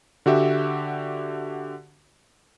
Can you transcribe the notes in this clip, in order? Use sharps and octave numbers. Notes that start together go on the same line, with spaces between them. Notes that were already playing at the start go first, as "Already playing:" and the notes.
D3 F#4 G4 E5